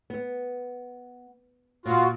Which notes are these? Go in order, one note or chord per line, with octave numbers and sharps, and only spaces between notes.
B3
A#2 F4 F#4